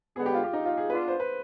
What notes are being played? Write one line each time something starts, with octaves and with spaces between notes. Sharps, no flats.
D3 G#3 B3 G#4
G4
F4
G4
D#4
F4
G#4
B3 D4 F4 B4
C5
B4